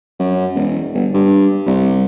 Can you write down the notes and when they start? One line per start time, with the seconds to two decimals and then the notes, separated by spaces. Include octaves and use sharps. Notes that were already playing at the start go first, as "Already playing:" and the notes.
0.19 F#2
0.55 E1
0.94 G1
1.14 G2
1.66 C2